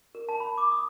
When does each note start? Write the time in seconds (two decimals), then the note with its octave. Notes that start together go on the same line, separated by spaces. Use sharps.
0.15 A#4
0.29 A5
0.40 B5
0.58 D6
0.72 D#6